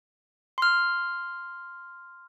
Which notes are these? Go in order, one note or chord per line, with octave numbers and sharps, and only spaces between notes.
C6 F6